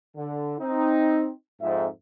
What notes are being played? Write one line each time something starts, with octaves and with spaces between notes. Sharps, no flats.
D3
C4 D#4
F2 G#2 E5